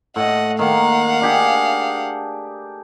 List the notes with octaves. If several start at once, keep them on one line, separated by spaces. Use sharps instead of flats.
A2 D#5 F#5
D#3 A#3 F5 F#5
D4 G4 G#4